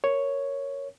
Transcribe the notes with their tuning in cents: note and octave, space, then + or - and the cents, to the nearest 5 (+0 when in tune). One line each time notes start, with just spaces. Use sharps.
A#4 +0 C#5 +0